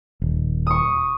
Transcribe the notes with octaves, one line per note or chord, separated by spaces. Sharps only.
D#1
C#6 D#6